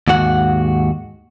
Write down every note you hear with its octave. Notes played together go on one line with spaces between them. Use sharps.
D#2 G#2 F#4 F#5